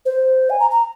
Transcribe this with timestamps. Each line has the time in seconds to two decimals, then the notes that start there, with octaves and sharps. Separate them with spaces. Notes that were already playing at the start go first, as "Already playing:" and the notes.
0.06 C5
0.50 G#5
0.60 A#5
0.71 A#5